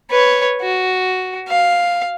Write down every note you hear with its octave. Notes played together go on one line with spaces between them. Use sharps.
B4 C#5
F#4
F5